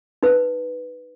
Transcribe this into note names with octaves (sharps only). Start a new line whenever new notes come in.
D#4 B4